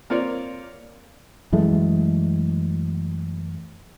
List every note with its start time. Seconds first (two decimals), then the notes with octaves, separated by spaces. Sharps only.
0.10 A#3 C4 F4 C#5 D5
1.52 F#2 E3 G#3 A3